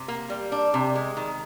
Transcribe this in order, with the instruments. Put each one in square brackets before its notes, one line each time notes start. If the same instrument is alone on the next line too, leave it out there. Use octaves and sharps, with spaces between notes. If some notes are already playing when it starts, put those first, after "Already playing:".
Already playing: [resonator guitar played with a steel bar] C3
A#3
G3
D4
C3
G#3
D#3